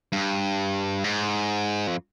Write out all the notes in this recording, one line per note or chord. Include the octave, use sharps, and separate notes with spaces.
G2
G#2
F2